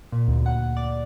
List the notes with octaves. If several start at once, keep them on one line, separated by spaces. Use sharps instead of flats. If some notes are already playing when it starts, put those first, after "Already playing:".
A#2
D2
F#5
D5